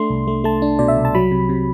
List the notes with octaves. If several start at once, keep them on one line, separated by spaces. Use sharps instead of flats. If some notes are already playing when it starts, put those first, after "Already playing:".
Already playing: A3 D4 C6
C2
A3
A3 A5
D4
B2 D5
E5
C2
A5
F#3 B5
C3
C3